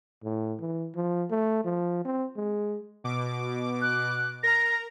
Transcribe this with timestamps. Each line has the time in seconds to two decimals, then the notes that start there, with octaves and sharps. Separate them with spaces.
0.24 A2
0.60 E3
0.96 F3
1.30 A3
1.65 F3
2.05 C4
2.37 G#3
3.04 B2 D6
3.82 F#6
4.43 A#4 A#5 A#6